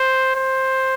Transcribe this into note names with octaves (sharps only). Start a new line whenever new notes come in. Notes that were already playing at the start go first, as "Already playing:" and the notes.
Already playing: C5
C5